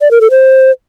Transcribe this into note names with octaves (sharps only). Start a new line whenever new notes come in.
D5
A#4
A4
C5